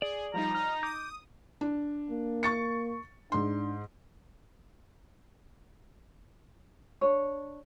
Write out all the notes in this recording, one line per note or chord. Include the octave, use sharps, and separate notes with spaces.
G#4 D5
F3 G3 D#4 A#5
D#4 F6
D6 D#6 G6
D4
A#3
C#6 A6 C#7
G#2 D4 C6
D4 C#5